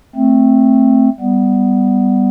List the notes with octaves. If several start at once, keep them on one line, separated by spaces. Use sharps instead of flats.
A3 C4
G3 B3